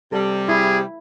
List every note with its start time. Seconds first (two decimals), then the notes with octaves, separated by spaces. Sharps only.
0.12 C3 G3 A4
0.49 E4 G#4